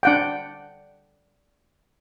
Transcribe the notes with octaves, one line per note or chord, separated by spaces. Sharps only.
D4 F#5 G5